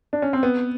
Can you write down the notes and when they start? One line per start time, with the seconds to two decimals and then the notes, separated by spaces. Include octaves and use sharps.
0.13 D4
0.22 C#4
0.33 C4
0.43 B3